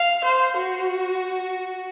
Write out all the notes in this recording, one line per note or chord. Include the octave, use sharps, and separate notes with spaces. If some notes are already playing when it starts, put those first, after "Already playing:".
Already playing: F5
C5
F#4